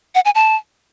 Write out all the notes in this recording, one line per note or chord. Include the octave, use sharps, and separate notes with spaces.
F#5
G#5
A5